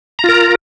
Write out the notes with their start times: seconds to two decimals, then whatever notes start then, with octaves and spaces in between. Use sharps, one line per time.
0.19 A#5
0.24 F4
0.29 A#4